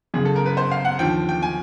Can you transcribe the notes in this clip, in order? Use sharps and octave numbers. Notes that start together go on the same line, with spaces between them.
F#1 F#2 C#3 G#4
A4
A#4
B4
C5
F5
F#5
D#2 D3 F3 G5
G5
G#5